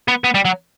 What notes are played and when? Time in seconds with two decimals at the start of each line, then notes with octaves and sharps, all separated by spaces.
0.08 B3
0.24 B3
0.35 G3
0.45 F#3